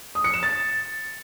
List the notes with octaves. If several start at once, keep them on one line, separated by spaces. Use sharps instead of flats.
D#6
C#7
E7
A6